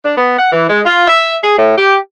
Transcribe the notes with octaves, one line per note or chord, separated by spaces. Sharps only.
D4
B3
F#5
E3
G#3
F4
E5
G#4
A2
G4